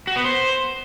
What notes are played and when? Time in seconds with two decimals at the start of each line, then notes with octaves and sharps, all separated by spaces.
0.07 F#4
0.16 B3
0.24 C5